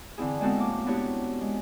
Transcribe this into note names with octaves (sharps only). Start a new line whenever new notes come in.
D3 E3 C4 E4 G#4
G#3 B3 C4 F#4 A4
A2 A#3 D6
B3 D4 E4 F#4 G4 C#5
G#3